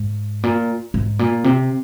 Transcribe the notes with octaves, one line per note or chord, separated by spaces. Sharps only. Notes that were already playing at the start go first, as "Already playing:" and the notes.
Already playing: G#2
A#2
G#2
A#2
C3